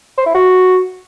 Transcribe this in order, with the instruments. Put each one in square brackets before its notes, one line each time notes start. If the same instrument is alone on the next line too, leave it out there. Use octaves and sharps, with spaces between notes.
[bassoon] C5
E4
F#4